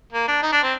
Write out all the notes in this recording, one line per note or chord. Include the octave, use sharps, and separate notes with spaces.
A#3
D4
D#4
D4
C4